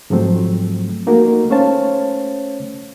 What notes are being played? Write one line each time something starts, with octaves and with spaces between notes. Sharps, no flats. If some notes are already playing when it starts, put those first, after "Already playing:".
G#2 F3 F#3 A3 C4
A3 A#3 D#4 F#4 A#4
A3 C#4 C5 C#5 F5 A5